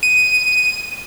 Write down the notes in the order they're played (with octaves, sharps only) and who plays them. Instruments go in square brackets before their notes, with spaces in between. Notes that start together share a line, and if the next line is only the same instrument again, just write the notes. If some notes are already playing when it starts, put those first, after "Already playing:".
[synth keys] D#7